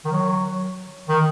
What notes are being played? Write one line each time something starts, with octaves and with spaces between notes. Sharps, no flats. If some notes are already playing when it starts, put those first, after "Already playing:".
D#3
F#3
D#3